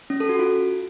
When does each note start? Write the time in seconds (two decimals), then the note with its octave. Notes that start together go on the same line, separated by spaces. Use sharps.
0.10 C#4
0.20 A4
0.29 F#4
0.39 F4